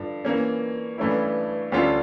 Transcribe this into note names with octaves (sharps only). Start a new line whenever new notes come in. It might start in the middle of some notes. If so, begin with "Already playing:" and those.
Already playing: G2 D3 F3
E3 A#3 C#4
G2 E3 A3 C#4 E4
D2 D3 G3 C#4 F4